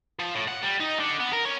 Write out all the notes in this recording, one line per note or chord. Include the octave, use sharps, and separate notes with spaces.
F3
A2
F#5
G3
D#4
D3
B3
A#4
C#4